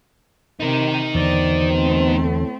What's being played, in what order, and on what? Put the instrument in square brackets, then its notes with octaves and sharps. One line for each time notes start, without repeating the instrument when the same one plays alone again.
[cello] C3 [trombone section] D#3 [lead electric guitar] D#4 A#4
[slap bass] E2 D3 [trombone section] B2 C5 [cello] D5
[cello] A3 C4
[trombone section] A2 E4 A4